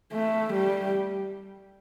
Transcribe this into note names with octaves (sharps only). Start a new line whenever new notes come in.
A3
G3